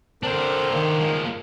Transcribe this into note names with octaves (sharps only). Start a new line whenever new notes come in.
D3 C4 D4 A#4 C5
D#3 A#3
F3 G#3